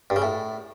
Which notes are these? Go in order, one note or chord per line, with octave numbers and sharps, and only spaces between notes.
G2
C#3
A2